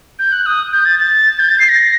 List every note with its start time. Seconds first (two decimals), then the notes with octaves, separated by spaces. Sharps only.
0.19 G6
0.32 F#6
0.46 D#6
0.73 G6
0.85 A6
1.00 A6
1.39 G6
1.49 A6
1.59 C7
1.69 A#6